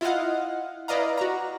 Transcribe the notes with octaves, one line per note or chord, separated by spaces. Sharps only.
E4 F4 D#5 F5 F#5
E4 B4 D5 D#5 F5 A#5
F#4 A#5